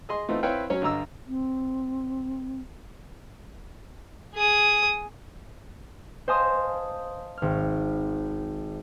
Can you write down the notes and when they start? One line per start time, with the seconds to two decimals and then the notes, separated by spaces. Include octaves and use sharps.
0.09 G#4 D#5 C6
0.29 E3 A3 B3 C4 D#4 F4
0.43 C4 E4 B4 C#5 F5 G5
0.70 F#3 C#4 C#5
0.82 G2 D3 D#5 A#5 E6
1.27 C4
4.35 G#4 D#6
6.28 C5 D#5 F5 G#5 A5 D#6
7.38 G#1 F6